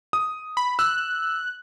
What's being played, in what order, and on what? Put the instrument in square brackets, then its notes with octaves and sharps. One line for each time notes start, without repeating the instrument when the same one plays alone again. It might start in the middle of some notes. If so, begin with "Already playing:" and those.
[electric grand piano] D#6
[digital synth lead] B5
[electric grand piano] E6 [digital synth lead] F#6